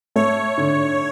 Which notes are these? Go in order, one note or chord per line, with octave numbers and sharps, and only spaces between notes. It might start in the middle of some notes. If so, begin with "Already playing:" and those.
A3 C#5
D3